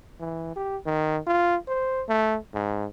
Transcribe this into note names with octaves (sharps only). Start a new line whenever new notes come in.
E3
G4
D#3
F4
C5
A3
G#2